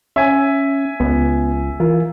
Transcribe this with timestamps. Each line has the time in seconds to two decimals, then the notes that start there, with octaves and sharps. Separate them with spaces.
0.16 C#4 E5 G#5
1.00 C#2 B3
1.80 E3 F4 A#4